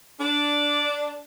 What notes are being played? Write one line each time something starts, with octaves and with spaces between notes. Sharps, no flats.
D4